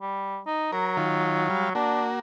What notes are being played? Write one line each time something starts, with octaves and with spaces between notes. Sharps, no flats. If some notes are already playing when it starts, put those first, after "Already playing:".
G3
D#4
F#3 A#4
D#3 F4
G3 F5
A#3 D4 F#4